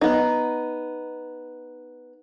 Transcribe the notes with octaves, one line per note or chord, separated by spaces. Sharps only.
B3 D#4